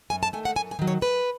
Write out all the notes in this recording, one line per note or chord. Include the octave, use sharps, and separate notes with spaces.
F#2 G#5
A5
D#3 A3 G#5
F#5
F#2 G#5
G#5
D#3 F#3
C#5
F#2 B4